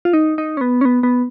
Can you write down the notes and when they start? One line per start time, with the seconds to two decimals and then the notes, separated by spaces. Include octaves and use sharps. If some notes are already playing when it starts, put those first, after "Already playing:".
0.05 F4
0.13 D#4
0.38 D#4
0.57 C#4
0.61 B3
0.81 C#4
0.85 B3
1.03 B3